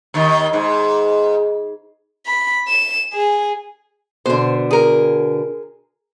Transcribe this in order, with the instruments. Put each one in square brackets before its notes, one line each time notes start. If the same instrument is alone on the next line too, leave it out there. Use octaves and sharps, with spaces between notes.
[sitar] D#2 D#3
G#2
[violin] B5
E7
G#4
[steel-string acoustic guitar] B2 D3 [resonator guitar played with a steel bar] C5
[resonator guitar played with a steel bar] G#4 A#4